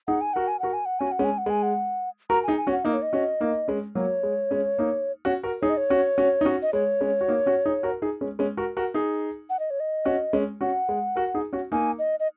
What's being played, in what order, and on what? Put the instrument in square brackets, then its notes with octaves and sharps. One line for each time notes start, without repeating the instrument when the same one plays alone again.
[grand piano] D#4 G#4 [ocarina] F#5
[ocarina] G#5
[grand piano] F#4 A#4 [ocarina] F#5
[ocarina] G#5
[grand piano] F#4 A#4 [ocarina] F#5
[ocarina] G#5
F#5
[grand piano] C#4 F#4 [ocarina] G#5
[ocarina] F#5
[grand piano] G#3 C#4
[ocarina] G#5
F#5
[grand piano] G#3 [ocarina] G#5
[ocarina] F#5
[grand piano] F#4 A#4 [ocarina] A#5
[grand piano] D#4 G#4 [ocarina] G#5
[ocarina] G#5
[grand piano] C#4 F#4
[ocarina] F#5
[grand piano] A#3 D#4 [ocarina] D#5
[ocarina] C#5
D#5
[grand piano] C#4 F#4
A#3 D#4
G#3 C#4
[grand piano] F#3 A#3 [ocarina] C#5
[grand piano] G#3
G#3 C#4
A#3 D#4
C#4 F#4
F#4 A#4
[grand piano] D#4 G#4 [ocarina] C#5
[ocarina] D#5
C#5
[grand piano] C#4 F#4
C#4 F#4
D#4
C#4 F#4
[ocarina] D#5
[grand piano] G#3 [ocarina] C#5
[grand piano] G#3 C#4
F#4
A#3 D#4
C#4 F#4
D#4 G#4
F#4 A#4
D#4 G#4
G#3 C#4
G#3 C#4
F#4 A#4
F#4 A#4
D#4 G#4
[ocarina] F#5
D#5
C#5
D#5
[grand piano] C#4 F#4
G#3 C#4
[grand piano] C#4 F#4 [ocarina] F#5
[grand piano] G#3
F#4 A#4
D#4 G#4
C#4 F#4
[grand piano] A#3 D#4 [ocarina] G#5
[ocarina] D#5
D#5